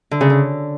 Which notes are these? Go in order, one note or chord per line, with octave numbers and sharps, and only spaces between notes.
D3
C#3
D3